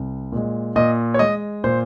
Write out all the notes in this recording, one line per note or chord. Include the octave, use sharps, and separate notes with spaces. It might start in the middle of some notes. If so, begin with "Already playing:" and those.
Already playing: C2
A#2 G#3
A#2 D#5
C#5
G#3 D#5
A#2 C5